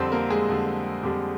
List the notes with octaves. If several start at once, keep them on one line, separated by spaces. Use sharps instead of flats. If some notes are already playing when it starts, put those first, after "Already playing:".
Already playing: F2 D3 G3 C4 C5
A#3 A#4
G#3 G#4
F2 D3 G3
F2 D3 G3 G4